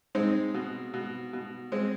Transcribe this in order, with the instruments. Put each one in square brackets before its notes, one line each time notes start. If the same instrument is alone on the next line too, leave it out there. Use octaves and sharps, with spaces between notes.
[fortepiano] G#3 C4 D#4
B2
B2
B2
G#3 C4